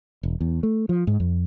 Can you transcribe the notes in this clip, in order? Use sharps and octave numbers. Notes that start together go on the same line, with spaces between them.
E1
E2
A3
F3
G#2
F2